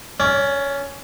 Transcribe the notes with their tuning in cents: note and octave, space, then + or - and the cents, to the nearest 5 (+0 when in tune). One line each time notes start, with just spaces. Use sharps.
C#4 +10 D5 -25